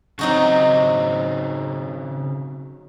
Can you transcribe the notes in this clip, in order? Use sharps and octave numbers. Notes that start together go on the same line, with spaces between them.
C#3 F#3 C4 D#4 F#4